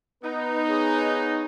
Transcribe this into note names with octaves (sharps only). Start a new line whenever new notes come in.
B3 D#4 B4
G#4 C#5